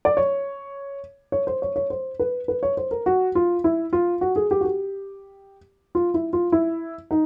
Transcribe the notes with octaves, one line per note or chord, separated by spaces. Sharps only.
D5
C#5
C#5
C5
C#5
C#5
C5
B4
B4
C#5
C5
A#4
F#4
F4
E4
F4
F#4
G#4
G4
F#4
G4
F4
E4
F4
E4
D#4